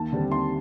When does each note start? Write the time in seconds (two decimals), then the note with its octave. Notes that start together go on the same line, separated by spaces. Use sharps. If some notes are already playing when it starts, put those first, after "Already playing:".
Already playing: D#2 A5
0.13 D3 G3 C4
0.31 D#2 C6